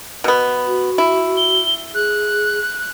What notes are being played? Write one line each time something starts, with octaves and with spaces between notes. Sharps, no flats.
B2 B3
F#4
E4
G7
G#4 F#6